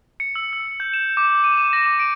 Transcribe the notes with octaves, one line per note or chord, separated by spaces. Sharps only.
C#7
E6
E6
G6
E7
D6
D#7
D#7
A#6
D6
D7